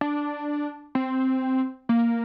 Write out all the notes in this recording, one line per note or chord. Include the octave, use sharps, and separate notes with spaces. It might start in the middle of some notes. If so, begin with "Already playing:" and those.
D4
C4
A#3